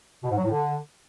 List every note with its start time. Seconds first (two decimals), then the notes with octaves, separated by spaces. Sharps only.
0.23 B2
0.30 G#2
0.37 F#3
0.44 A2
0.51 D3